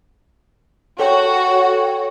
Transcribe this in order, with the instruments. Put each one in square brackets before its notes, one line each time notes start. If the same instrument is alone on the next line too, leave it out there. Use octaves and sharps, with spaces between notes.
[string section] F#4 [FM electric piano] A4 C#5 G5